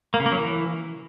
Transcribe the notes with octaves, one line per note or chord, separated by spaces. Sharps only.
A#3
C#3
A#3
F#3
E3